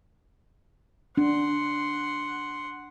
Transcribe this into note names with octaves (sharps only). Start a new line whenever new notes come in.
D4 F#5 C6